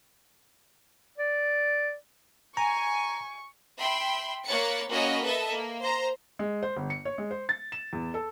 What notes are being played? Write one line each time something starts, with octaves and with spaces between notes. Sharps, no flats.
D5
G#5 A#5 C#6
E5 G5 B5 C6
A#3 C#5 B5 F#6 A6 C#7
A#3 C#4 F#4 D#5 B5 F6
A4 B4 D#5 E5 A5
A#3
C5 A#5
G#3
C5
G1
C#7
C#5
G#3
C5
A6
E7
E2
A4